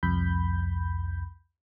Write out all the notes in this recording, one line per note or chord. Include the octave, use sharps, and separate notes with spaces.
C2 F2 B5 G6